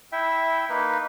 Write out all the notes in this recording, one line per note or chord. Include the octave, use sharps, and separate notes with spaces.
E4 E5 G5
A#3 D#4 B4